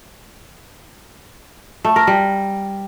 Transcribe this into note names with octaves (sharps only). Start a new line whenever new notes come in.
A3
A#4
G3